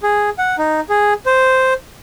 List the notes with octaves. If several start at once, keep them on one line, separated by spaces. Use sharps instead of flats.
G#4
F#5
D#4
G#4
C5